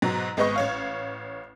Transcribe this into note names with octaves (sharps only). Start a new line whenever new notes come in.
G#2 B2 F#3
G#1 G#3 B3 B4 D#5 C#6
A1 C#5 F5